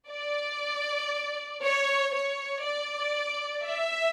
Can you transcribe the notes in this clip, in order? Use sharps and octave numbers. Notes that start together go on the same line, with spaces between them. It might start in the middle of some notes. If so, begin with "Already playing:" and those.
D5
C#5
C#5
D5
E5